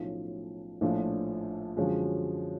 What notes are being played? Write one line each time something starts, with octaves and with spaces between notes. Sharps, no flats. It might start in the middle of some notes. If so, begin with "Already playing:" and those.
Already playing: B1 A2 F3 A3 C#4
A#1 A2 F3 A3 D4
F#2 D3 F3 G#3 C#4